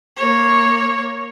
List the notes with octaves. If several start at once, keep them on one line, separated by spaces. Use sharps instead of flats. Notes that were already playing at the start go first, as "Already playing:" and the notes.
A#3 C#5